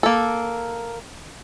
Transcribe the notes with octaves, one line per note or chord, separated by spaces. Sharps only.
A#3 A4